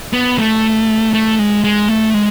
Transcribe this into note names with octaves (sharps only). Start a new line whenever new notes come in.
B3
A3
A3
G#3
G#3
A3
G#3